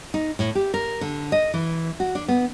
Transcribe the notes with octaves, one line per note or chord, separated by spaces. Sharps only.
D#4
A2
G4
A#4
D3
D#5
E3
F#4
D4
B3